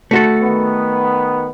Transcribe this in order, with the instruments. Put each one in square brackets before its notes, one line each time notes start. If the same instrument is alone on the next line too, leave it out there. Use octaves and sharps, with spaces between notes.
[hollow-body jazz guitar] A3 F#4 A4
[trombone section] D#3 B3